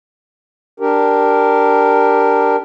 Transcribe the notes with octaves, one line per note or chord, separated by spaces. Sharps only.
D4 G4 A#4